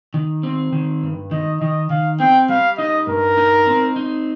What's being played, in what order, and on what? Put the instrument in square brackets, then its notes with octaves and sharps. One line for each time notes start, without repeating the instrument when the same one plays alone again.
[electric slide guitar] D#3
C4
D#3
G2
[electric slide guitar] D#3 [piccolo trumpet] D#5
[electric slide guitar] D#3 [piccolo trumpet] D#5
[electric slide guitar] D#3 [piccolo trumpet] F5
[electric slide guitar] C4 [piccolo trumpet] G5
[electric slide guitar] G3 [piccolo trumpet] F5
[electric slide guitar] D#4 [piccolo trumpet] D#5
[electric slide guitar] G2 [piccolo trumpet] A#4
[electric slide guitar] D#4
C4
D#4